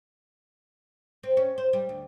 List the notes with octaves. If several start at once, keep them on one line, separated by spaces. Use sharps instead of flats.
C4
C#4
C5
G3
D2